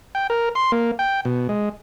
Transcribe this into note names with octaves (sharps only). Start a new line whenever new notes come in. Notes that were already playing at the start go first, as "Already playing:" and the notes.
G5
A#4
C6
A#3
G5
B2
G#3